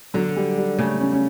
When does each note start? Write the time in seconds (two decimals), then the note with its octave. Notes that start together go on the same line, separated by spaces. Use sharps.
0.14 D3 F#3
0.36 G3
0.57 G3
0.79 C#3 A3
1.00 C#4
1.13 C#4